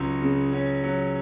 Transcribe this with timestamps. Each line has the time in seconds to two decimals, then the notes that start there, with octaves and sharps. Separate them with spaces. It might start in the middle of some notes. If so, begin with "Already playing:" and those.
Already playing: C#2 F#3
0.22 C#3
0.53 C#4
0.83 F#3